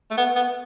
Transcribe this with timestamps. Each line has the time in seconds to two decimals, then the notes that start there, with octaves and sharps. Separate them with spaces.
0.11 A3
0.17 B3
0.35 B3